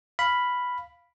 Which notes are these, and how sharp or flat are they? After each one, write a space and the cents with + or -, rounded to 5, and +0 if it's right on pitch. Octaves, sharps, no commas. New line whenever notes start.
F5 -5 B5 +0